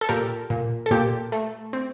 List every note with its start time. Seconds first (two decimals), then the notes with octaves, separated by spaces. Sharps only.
0.01 A4
0.09 A#2 G4 A#4
0.50 A#2
0.86 A4
0.91 A#2 G4
1.32 A3
1.73 C4